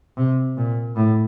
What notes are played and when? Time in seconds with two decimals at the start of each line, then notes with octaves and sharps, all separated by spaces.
0.17 C3
0.57 A#2
0.96 A2